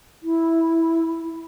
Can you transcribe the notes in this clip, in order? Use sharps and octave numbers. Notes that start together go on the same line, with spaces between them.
E4